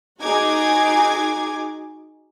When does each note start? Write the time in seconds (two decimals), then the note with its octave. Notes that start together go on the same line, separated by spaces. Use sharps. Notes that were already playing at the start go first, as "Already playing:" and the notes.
0.22 D#4 F#4 G#4 D6 G#6